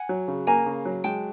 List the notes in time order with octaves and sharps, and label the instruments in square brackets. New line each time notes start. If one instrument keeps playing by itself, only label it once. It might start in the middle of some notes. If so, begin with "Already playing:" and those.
Already playing: [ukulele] F#5 G#5
[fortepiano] F#3
C#3
[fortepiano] A#3 [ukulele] G#5 A#5
[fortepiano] C#3
F#3
[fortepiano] G#3 [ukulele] G5 A5